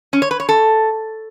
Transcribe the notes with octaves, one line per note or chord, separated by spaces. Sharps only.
C#4
C#5
B4
C#5
A4